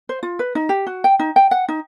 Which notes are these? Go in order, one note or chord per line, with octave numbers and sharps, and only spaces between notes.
C5
F4
B4
D#4
G4
F#4
G5
D#4
G5
F#5
D#4